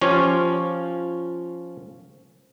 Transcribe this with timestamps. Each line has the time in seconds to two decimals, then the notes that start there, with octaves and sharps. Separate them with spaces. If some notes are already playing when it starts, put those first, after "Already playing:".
0.01 F3 C#4 F4 G4 C#5